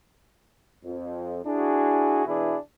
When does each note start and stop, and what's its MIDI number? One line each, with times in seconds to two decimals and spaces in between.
0.85 1.39 41
1.46 2.23 62
1.46 2.23 64
1.46 2.23 66
1.46 2.23 68
2.26 2.56 47
2.26 2.56 52
2.26 2.56 62
2.26 2.56 64
2.26 2.56 68